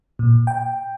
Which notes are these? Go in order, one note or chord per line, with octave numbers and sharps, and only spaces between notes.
A#2
G5